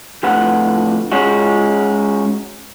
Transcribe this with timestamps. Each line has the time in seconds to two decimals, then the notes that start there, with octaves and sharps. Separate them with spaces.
0.24 F2 A2 D3 B4 F#5
1.12 G#3 C#4 D#4 F#4